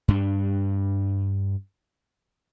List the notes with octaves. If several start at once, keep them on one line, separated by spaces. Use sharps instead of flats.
G2 D4